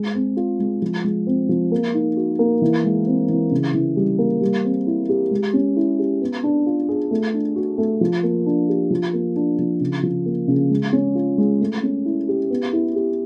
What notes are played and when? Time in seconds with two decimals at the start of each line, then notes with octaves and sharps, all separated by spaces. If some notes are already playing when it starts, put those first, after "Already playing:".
Already playing: G#3
0.15 C4
0.37 F4
0.60 G#3
0.82 F3
1.04 G#3
1.27 C4
1.49 F3
1.72 A#3
1.94 D#4
2.17 F#4
2.39 A#3
2.62 E3
2.84 G#3
3.07 C4
3.29 E3
3.51 C#3
3.74 E3
3.96 G3
4.19 A#3
4.42 G3
4.64 C4
4.87 E4
5.09 G4
5.31 G#3
5.54 C#4
5.76 E4
5.99 G4
6.22 B3
6.43 D4
6.66 F4
6.89 G#4
7.11 A3
7.34 D4
7.56 F#4
7.78 A3
8.01 F3
8.23 A#3
8.46 D4
8.69 G4
8.91 F3
9.13 A#3
9.36 D4
9.59 F3
9.80 C#3
10.03 F3
10.26 A#3
10.48 C#3
10.70 G#3
10.93 C#4
11.15 F4
11.38 G#3
11.61 A3
11.83 C#4
12.05 E4
12.28 G4
12.50 B3
12.73 E4
12.95 G4